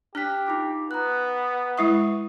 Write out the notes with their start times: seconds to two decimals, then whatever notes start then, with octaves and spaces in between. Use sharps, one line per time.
0.15 D4 G4 F6 F#6 B6
0.47 D#4 F4 D6
0.91 B3 A#5 F#6
1.78 G#3 E4 E5 B5 C#6 D#6